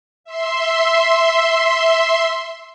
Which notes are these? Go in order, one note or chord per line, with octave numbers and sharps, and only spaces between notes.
E5 C6